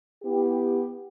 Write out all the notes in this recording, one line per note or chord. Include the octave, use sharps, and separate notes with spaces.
B3 E4 G4